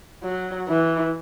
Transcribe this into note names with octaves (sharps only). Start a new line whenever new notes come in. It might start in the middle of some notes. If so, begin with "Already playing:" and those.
F#3
E3